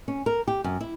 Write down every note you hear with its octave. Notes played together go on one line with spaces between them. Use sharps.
C#4
A#4
G4
F#2
E4